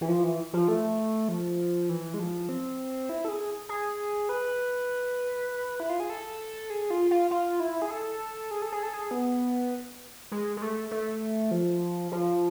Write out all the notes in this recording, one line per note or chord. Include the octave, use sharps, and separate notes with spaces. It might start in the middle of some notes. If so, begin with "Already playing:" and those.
E3
F3
E3
F3
A3
F3
E3
G#3
F3
C4
E4
A4
G#4
G#4
B4
E4
F4
G#4
A4
G#4
F4
F4
F4
E4
G#4
A4
G#4
A4
G#4
A4
G#4
B3
G#3
G#3
A3
A3
F3
F3